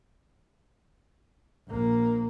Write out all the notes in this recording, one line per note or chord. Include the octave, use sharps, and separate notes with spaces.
A#1 A#3